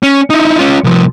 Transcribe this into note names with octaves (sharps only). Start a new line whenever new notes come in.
C#4
D#4 E4
C#4 F4
C2 F3